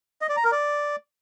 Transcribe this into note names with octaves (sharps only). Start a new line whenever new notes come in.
D#5
D5
A#5
A#4
D5